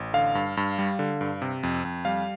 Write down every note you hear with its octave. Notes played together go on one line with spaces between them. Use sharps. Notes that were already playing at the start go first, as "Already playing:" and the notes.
Already playing: A1
D3 F5
G2
G2
G3
D3
G2
C3
F2
F2
G3 F5